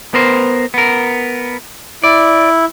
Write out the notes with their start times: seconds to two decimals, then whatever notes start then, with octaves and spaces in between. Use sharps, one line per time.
0.14 B3 A#4 C5
0.74 B3 A#4
2.04 E4 D5